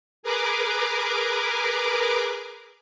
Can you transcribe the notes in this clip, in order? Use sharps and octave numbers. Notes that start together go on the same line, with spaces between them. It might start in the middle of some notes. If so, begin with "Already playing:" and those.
G#4 A#4 B4 D6